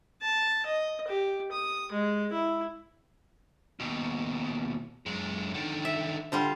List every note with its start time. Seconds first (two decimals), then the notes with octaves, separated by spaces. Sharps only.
0.22 A5
0.66 D#5
1.08 G4
1.52 D#6
1.92 G#3
2.33 E4
3.80 D#2 B2
5.06 F#2 G#3
5.54 D3 D#3
5.85 E5
6.32 D3 G3 F4